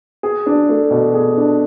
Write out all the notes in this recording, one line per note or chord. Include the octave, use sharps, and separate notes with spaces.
G#4
D4
A3
B2
G#4
D4